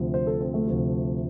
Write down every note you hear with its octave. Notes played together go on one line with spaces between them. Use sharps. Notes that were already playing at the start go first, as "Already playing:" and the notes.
Already playing: D2 C3 F3
C5
A4
C4
A3
D2 C3 F3